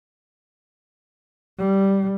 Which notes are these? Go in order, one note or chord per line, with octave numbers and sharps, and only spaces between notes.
G3